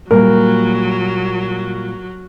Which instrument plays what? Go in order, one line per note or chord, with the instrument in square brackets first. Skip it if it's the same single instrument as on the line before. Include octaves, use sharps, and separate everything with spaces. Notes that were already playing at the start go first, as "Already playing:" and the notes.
[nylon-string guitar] A#2 G3 A#3 [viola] F#3 [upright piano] A#4